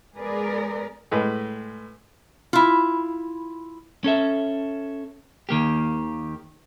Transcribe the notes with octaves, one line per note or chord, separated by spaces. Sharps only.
G#3 B3 G#4 A#4 B4 D5
A2 G#3 B4
E4 F4
C#4 A4 E5
D#2 D#3 A#3 G4